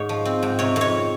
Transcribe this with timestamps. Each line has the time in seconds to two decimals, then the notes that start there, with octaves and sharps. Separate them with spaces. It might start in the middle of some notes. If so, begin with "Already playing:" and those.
Already playing: G#2 C#5
0.09 F3
0.25 C4
0.43 G#2
0.59 C3 C#5
0.76 F2
0.81 C#5